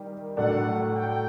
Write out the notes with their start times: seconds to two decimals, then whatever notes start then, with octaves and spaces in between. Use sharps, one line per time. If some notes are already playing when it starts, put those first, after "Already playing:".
Already playing: D#3 G3
0.37 A2 F#3 A3 D4 F#5
0.96 G5